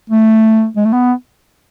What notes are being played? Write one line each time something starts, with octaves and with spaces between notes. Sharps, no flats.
A3
G#3
A3
B3